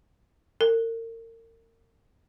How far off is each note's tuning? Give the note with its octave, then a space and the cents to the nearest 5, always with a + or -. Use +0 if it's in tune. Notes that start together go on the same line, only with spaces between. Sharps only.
A#4 -35